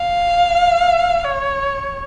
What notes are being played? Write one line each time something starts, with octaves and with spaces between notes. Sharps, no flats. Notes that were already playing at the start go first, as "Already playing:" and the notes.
Already playing: F5
C#5